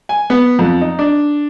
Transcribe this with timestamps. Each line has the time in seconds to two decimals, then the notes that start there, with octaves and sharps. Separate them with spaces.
0.09 G#5
0.30 B3
0.59 F2
0.81 D#4
0.99 D4